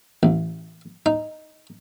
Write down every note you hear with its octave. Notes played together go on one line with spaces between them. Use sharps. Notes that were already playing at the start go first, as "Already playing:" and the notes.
A1
D#4